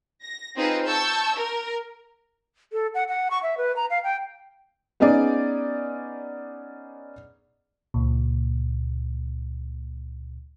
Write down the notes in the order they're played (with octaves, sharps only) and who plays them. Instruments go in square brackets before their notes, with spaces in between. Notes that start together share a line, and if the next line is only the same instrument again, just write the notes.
[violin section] A#6
C4 D#4 F4 G#4 B4 C5
A5 C#6 E6 G6
A#4
[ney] A4
F#5
F#5
C#6
E5
B4
A#5
F5
G5
[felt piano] B3 C#4 D#4 G#4 D5
[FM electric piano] C#2 A#2